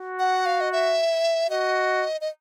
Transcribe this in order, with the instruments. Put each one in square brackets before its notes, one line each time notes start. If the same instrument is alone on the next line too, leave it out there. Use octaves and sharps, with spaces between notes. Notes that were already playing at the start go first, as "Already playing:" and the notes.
Already playing: [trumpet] F#4
[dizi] F#5
F5
D#5
E5
[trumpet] F#4 [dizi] D#5
[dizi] D#5